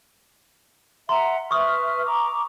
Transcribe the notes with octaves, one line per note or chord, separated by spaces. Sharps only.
E5 F#5 A#5 C6
B4 E5 C#6 D#6 F6
A#5 D6